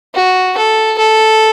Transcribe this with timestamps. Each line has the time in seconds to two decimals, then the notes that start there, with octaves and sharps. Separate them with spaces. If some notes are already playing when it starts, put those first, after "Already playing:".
0.15 F#4
0.57 A4
0.98 A4